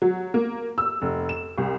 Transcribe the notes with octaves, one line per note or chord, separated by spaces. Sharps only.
F#3
A#3
E6
F1
E7
C2